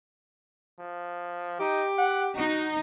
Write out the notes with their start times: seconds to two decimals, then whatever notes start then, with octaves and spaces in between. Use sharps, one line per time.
0.79 F3
1.60 D#4 G4
1.98 F#5
2.36 D#4 F#4